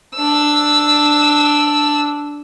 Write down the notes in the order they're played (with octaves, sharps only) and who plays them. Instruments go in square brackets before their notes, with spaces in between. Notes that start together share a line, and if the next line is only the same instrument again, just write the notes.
[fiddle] D4 E6